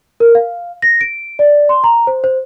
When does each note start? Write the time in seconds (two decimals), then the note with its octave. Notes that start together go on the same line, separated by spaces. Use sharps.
0.20 A#4
0.35 F5
0.82 A#6
1.01 D7
1.39 D5
1.69 C6
1.84 A#5
2.07 C5
2.24 C5